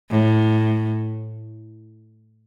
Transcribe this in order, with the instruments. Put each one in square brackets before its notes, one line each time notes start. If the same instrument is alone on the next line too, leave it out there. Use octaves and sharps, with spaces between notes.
[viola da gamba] A2